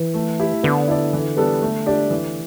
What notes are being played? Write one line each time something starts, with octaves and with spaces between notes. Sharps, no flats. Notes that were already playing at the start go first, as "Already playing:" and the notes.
Already playing: E3
A3
E4 G4
D3 B3
E4 A4 D5
E3
G3 B3 D4 A4
A3
D4 G4 D5
E3